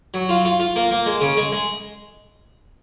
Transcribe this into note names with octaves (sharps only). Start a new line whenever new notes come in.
F#3
F4
F4
F4
A#3
A#3
G#3
C#3
G#3
G#3